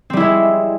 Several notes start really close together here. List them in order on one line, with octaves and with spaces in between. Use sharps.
C4 G3 E4 G#3